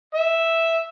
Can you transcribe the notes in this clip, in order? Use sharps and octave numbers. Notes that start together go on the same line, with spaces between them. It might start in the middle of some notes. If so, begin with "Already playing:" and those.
E5